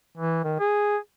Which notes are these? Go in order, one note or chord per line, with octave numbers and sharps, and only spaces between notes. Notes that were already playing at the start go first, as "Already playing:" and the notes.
E3
D#3
G#4